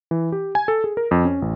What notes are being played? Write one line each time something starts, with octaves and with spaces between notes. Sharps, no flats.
E3
G4
G#5
A4
G#4
A#4
F2
C#4
A1